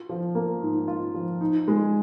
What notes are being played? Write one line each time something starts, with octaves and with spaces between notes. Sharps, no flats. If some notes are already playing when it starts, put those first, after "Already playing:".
Already playing: F4
F3
A#3
G#2
F4
F3
D#4
G#3